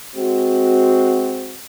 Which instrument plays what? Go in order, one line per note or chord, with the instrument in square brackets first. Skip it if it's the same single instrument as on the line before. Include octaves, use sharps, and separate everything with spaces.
[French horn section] G#3 C4 F#4